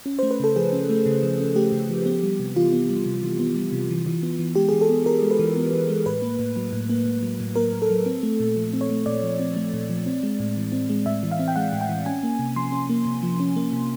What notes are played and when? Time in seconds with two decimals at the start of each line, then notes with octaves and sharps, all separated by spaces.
0.06 C#4
0.19 A3 C5
0.31 B4
0.40 C#3 A4
0.56 F3 G#4
0.73 C#4
0.89 A3
1.06 C#3
1.23 F3
1.40 C#4
1.56 A3 G4
1.72 C#3
1.89 F3
2.06 B3
2.23 G3
2.40 C3
2.56 E3 F4
2.73 B3
2.89 G3
3.06 C3
3.23 E3
3.39 B3
3.56 G3
3.72 C3
3.90 E3
4.07 E3
4.23 B3
4.39 E3
4.56 G#3 G4
4.69 E3 G#4
4.81 A4
4.89 B3
5.06 E3 A#4
5.23 G#3
5.31 B4
5.39 E3
5.57 B3
5.73 E3
5.89 G#3
6.06 A2 B4
6.22 A#3
6.39 A2
6.56 F#3
6.73 A2
6.89 A#3
7.06 A2
7.22 F#3
7.40 A2
7.56 A#3 A#4
7.73 A2
7.82 A4
7.90 F#3
8.06 C4
8.23 A3
8.40 A#2
8.57 F3
8.73 C4
8.81 C#5
8.90 A3
9.06 A#2 D5
9.23 F3
9.39 C4
9.56 A3
9.74 A#2
9.89 F3
10.06 C4
10.23 G#3
10.40 A2
10.57 E3
10.72 C4
10.89 G#3
11.06 A2 E5
11.23 E3
11.32 F5
11.39 C4
11.48 G5
11.56 G#3 F#5
11.73 A2
11.81 G5
11.89 E3
12.06 C#4 G#5
12.23 A#3
12.39 C3
12.56 F3 C6
12.72 C#4
12.90 A#3
13.06 C3
13.23 F3
13.40 C#4
13.56 A#3
13.73 C3